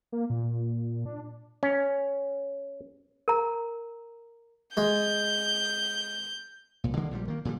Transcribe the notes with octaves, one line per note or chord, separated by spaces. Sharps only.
A#3
A#2
D4
C#4
A#4 A#5
G#3 G6
C2 A#2
D3 E3 G#3 A#3
A#1 A#2 D3 G3
D#3 A#3
A#2 D3 F3 G3